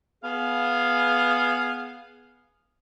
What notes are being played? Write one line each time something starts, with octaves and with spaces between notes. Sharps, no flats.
B3 G#4 F5